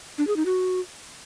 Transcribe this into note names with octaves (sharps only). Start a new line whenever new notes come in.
D4
G#4
D#4
F#4